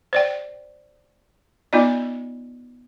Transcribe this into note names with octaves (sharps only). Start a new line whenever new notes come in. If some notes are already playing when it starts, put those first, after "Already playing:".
C5 D5 G5
B3 D#4 F4 D5 D#5